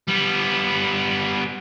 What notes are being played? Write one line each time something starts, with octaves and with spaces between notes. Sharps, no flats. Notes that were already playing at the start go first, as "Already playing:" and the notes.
G3 B3